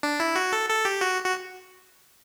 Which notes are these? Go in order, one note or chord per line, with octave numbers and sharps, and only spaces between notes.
D4
E4
F#4
A4
A4
G4
F#4
F#4